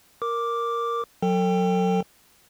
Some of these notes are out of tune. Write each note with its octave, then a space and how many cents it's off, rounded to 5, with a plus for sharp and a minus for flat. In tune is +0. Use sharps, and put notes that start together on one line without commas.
A#4 +0 D6 +0
F#3 -20 A4 +35 G5 +15